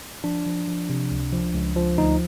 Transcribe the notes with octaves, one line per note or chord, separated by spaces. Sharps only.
F3 D4
F3
F3
C3
C#2
F3
C#2
F3
D2 D#4